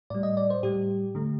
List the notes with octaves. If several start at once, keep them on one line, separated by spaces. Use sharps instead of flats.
A2 G3 D5
D#5
D5
C5
A2 G3 G4
D3 A3